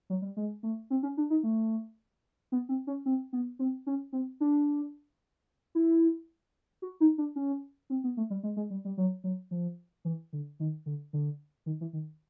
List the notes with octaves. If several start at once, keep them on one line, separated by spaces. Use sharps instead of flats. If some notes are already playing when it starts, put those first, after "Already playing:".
F#3
G3
G#3
A3
C4
C#4
D4
D#4
A3
B3
C4
C#4
C4
B3
C4
C#4
C4
D4
E4
F#4
D#4
D4
C#4
C4
B3
A3
G3
G#3
G#3
G3
G3
F#3
F#3
F3
E3
D3
D#3
D3
D3
D#3
E3
D#3